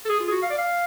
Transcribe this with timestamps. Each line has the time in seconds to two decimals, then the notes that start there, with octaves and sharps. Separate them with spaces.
0.05 A4
0.09 G#4
0.20 F4
0.28 G#4
0.31 F#4
0.43 F5
0.51 D5
0.58 F5